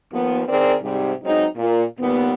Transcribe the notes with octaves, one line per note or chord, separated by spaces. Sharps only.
D#2 F3 B3
D#3 C4 G#4 A#4 D5
G#2 C3 G3
F#3 G#3 C4 D#4
A#2
D#2 A#2 G3 B3